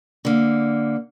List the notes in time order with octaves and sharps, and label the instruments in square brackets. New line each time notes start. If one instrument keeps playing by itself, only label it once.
[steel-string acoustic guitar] D3 A#3